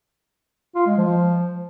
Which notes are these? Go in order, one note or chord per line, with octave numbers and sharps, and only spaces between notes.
F4
G#3
F3